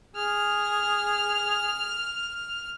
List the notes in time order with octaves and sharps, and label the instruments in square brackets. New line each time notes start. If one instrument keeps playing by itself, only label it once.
[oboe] G#4 [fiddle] F6